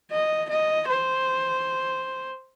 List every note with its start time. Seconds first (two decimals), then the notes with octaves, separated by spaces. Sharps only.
0.12 D#5
0.50 D#5
0.88 C5